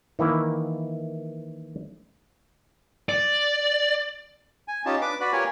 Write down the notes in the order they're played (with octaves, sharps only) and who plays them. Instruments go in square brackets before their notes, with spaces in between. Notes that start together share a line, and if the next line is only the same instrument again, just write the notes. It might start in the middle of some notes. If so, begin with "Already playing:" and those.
[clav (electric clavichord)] D#3 E3 A#3 E4
[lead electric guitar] D5
[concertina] G#5
C#4 D#4 F4 G4 A5
D4 B4 D6
F#4 B4 D5 B5
F4 G4 A#4 C#5 G#5